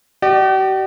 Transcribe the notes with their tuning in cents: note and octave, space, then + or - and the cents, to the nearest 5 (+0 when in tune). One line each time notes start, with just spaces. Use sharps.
G4 -45 D5 +35